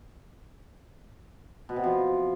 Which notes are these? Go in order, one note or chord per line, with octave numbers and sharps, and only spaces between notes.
B2
C3
F3